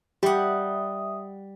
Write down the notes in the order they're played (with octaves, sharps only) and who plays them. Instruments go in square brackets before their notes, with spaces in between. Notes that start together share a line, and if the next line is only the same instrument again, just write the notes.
[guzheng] G3 F#5 [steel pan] G4 [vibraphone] E5 D#6